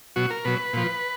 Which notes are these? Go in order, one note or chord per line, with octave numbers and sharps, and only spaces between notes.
B2 F#3 F#4
A#4
B2 F#3 B4
A#2 F3